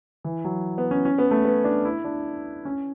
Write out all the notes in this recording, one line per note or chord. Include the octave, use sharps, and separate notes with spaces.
E3
F#3
B3
C#4
C#4
B3
A3
B3
D4
E4
D4
C#4